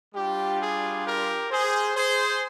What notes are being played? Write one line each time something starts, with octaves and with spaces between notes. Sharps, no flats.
G3 D4 F4 G4
G#4
G4 A#4
G#4 C5
G#4 C5